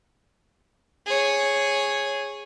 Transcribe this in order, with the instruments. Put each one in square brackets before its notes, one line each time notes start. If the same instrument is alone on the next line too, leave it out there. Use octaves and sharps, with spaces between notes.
[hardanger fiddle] G#4 C#5